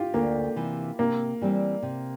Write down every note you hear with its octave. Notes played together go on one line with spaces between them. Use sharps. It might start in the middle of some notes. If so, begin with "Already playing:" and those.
Already playing: F4 G4
D2 A#3
C3 E3
C3 A#3
E3 G3 C4
C3